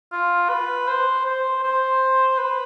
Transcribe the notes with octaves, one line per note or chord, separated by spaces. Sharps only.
F4
B4
C5
C5
C5
B4